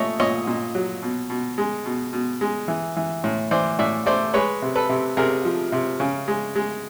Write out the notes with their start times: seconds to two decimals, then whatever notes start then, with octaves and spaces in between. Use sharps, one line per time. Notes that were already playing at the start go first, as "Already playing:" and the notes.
Already playing: A#2 A3 C#5 D#5
0.20 A#2 C#5 D#5
0.47 A#2
0.75 F#3
1.02 B2
1.30 B2
1.58 G#3
1.85 B2
2.13 B2
2.41 G#3
2.68 E3
2.96 E3
3.24 A2
3.51 E3 C5 D5
3.79 A2 D5 E5
4.06 A3 C5 D5
4.34 G#3 B4 C#5
4.62 C3
4.76 A4 B4
4.89 C3
5.17 C3 G#4 A#4
5.45 F3
5.72 C3
6.00 C#3
6.28 G#3
6.56 G#3